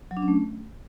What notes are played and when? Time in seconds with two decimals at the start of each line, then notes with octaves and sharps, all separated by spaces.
0.11 F#3
0.17 D4
0.22 C#4
0.28 A3